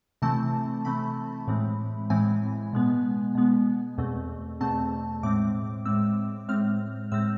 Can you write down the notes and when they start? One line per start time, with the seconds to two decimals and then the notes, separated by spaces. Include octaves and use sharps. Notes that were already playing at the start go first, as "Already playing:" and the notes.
0.22 C3 E3 A3 C4 A5
0.85 C3 E3 A3 C4 B5
1.47 A2 E3 G#3 C4
2.10 A2 E3 G#3 C4 G#5
2.73 B2 G#3 B3
3.35 B2 G#3 B3
3.98 E2 B2 A3 C4
4.61 E2 B2 A3 C4 A5
5.23 A2 G#3 C4 D6
5.86 A2 G#3 C4 E6
6.48 A2 G#3 C4 F6
7.12 A2 G#3 C4 E6